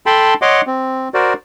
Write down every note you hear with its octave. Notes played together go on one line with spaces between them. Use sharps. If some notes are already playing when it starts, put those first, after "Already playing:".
A4 G5 A5 B5 C6
C#5 D#5 F#5 C6 D6
C4
F#4 A#4 C5 D5